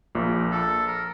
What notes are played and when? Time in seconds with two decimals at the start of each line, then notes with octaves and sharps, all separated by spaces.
0.15 A#1 A#2
0.51 A4
0.87 A#4